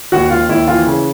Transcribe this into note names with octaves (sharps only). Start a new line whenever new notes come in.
D#2 F#4
D#2 F4
D#2 E4
E3 F4
C#3